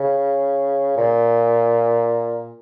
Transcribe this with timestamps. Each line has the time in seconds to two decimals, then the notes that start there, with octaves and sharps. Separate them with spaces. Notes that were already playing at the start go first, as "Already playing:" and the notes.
Already playing: C#3
0.97 A#2